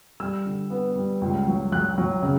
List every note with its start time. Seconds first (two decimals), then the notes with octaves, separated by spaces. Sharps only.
0.20 G3 E6
0.45 D3
0.70 B3
0.96 G3
1.21 C#2
1.47 F#3
1.72 F#3 F#6
1.98 F#3
2.22 C#3